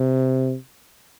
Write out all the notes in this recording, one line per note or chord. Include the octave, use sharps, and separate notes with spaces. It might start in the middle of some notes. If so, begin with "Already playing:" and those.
Already playing: C3